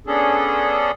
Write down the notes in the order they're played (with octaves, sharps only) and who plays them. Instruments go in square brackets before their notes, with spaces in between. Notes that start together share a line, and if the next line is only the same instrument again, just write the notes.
[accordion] B3 C#4 D4 G#4 A4